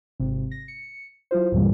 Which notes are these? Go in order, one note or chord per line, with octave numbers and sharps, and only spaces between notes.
G#1 C3
A#6
C#7
F#3 E4 F4 C5
C#2 G2 A#2 C#3 E3 G3